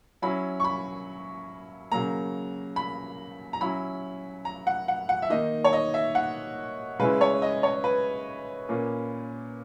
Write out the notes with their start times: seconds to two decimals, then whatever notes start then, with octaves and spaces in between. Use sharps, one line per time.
0.22 F#3 C#4 E4 B5
0.60 C#6
0.64 B5
1.92 C#3 F#3 A#3 A#5
2.76 B5
3.53 A#5
3.61 F#3 C#4 E4 B5
4.45 A#5
4.67 F#5
4.88 F#5
5.09 F#5
5.22 E5
5.30 D#3 A#3 D#4 D#5
5.64 C#5
5.73 D#5
5.94 E5
6.15 F#5
6.99 C#3 G#3 C#4 E4 B4
7.21 C#5
7.42 D#5
7.63 C#5
7.84 B4
8.69 A#2 A#3 C#4